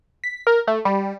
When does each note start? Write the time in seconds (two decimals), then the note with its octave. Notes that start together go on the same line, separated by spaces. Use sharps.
0.24 B6
0.47 A#4
0.68 A3
0.85 G3